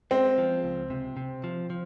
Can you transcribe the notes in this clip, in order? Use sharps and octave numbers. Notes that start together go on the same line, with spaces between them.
G#3 C4
F3
C#2
C3
C3
F3
F3